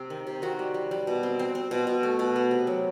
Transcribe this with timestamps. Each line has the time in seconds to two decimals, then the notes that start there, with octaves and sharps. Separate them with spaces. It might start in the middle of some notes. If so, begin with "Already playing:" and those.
Already playing: C3 C4
0.10 D#3
0.27 C3
0.42 D#3 F#4
0.59 G3
0.74 G3
0.91 G3
1.07 B2
1.23 C4
1.39 C4
1.55 C4
1.71 B2
1.87 B2
2.03 A3
2.19 B2
2.36 B3
2.51 C3
2.67 F#3